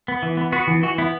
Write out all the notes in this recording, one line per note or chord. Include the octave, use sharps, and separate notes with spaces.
B3
E3
B3
B3 F#4
E3
E3 F#4
B3 E4